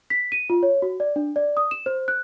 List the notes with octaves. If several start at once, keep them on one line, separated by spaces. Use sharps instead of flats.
B6
D#7
F4
C#5
F#4
D5
D4
D5
D#6
E7
C5
F#6